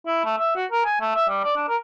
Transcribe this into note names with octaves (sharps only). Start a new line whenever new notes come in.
E4
A3
E5
F#4
A#4
G#5
A3
E5
G3
D5
D4
A#4